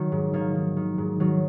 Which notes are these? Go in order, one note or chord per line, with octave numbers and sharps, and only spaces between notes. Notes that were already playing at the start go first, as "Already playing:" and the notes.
Already playing: D#3 F#3
G#2
D#3 A#3
D#3
D#3
G#2
D#3 F#3